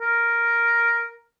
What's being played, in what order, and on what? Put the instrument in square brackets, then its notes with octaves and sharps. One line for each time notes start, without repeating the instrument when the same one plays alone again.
[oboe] A#4